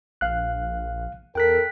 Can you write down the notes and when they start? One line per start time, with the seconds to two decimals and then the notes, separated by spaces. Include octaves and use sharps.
0.21 A#1 F5 F#6
1.35 E2 A4 A#4 G5 F#6 B6